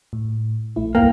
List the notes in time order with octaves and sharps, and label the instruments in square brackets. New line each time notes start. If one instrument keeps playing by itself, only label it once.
[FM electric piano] A2
A#1 A3 E4
[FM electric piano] C#2 G2 G5 [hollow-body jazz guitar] A#3